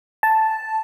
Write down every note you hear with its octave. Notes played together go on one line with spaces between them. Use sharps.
A5